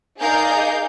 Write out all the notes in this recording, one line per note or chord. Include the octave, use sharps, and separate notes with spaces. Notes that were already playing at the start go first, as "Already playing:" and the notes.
D#4 G#4 A#4 D5 F5 G6